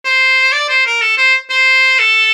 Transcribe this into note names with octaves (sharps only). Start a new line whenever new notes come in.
C5
D5
C5
A#4
A4
C5
C5
A4